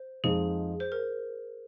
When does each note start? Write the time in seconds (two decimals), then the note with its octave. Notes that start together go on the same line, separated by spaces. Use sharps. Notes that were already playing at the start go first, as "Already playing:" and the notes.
Already playing: C5
0.24 F2 F3 G#3 D#4 G#4
0.80 C5
0.92 A#4